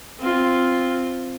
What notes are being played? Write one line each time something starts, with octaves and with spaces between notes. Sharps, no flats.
C4 F4